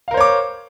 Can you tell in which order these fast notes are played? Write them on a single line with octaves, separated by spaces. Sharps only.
F5 A#4 C5 C#5 D6